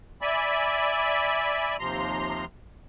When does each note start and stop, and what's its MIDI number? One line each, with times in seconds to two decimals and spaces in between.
0.22 1.77 74
0.22 1.77 76
0.22 1.77 80
0.22 1.77 83
1.79 2.45 39
1.79 2.45 48
1.79 2.45 53
1.79 2.45 82
1.79 2.45 84